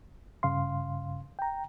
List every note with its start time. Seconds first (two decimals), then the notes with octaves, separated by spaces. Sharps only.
0.43 G2 C#3 F5 C6
1.39 G5 A#5